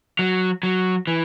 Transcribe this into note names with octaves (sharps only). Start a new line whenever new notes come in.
F#3
F#3
E3